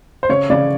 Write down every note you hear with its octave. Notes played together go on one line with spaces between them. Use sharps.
C5
C#3 C#5
C#3 D5